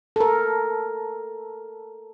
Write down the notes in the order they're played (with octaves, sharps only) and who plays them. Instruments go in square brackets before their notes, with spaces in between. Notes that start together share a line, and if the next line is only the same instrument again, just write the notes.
[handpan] A4 A#4